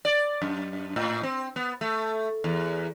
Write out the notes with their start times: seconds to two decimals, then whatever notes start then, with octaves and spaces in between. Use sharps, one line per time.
0.05 D5
0.42 F#2
0.96 A2
1.23 C4
1.56 B3
1.81 A3
2.44 E2